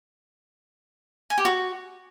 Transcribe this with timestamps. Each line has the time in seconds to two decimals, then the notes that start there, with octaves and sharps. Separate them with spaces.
1.30 G#5
1.38 G4
1.45 F#4